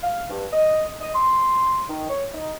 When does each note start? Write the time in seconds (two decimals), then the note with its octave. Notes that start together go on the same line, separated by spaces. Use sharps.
0.03 F5
0.30 G2
0.52 D#5
1.01 D#5
1.14 C6
1.89 D#3
2.10 C#5
2.34 D#4